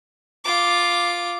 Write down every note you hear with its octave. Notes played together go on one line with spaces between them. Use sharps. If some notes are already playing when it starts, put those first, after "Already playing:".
F4 D6